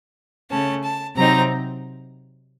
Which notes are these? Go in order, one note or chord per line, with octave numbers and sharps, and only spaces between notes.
C#3 A3 C#4 A5
A5
C3 F#3 C4 D#4 A#5